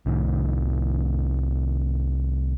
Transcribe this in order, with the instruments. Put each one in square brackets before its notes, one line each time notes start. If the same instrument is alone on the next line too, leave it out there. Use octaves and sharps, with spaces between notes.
[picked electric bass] C2 A2 D#3